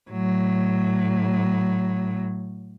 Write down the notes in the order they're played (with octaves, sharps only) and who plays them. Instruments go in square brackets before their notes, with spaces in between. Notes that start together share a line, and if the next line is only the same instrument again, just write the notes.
[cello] A2 F#3